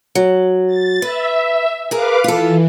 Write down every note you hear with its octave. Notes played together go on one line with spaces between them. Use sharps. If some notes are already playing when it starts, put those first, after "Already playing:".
F#3
A6
B4 E5
G#4 A#4 B4 F5 D6
E3 F4 A4